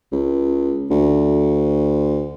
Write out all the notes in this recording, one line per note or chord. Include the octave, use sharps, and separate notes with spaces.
C#2
D2